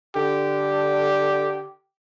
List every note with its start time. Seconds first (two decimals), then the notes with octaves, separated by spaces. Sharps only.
0.16 D3 G4